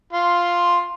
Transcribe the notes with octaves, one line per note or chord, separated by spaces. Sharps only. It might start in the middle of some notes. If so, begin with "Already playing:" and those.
F4 C6